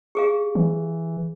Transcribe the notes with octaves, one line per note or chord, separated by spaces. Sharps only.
G4 G#4 F5
E3